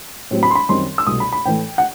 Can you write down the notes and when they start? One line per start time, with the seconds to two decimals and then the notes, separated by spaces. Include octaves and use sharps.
0.31 A2 F#3 C4
0.43 B5
0.51 C6
0.55 B5
0.69 F#2 D#3 G3 C4 D#4 C6
0.98 E6
1.07 C2 B2 A3 D#6
1.20 B5
1.33 B5
1.45 A2 E3 A3 G5
1.78 F#5